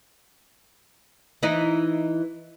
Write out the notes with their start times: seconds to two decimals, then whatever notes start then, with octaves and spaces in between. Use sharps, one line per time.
1.43 E3 D#4